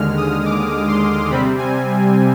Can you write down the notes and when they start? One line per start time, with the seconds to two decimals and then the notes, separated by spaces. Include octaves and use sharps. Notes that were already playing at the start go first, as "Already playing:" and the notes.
Already playing: D#2 D3 G#3 F6
0.17 D#6
0.46 D6
0.88 C6
1.31 C3 G3 C4 B5
1.58 G#5